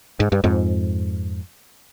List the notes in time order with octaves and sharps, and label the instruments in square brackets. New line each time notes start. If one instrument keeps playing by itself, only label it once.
[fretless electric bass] G#2
G2
F2 G#2